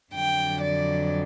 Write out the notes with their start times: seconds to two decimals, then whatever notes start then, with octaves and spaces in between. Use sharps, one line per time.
0.14 F2 D3 F#3 G5
0.61 D5